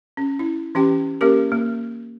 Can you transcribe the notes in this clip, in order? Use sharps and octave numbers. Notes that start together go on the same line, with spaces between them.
C#4
E4
E3 C#4 G4 G5
A#3 C#4 G4 A#4
A#3